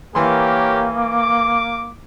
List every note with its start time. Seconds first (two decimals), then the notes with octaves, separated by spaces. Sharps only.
0.15 E3 A#3 G4 A#4 C#5 C6
0.97 D6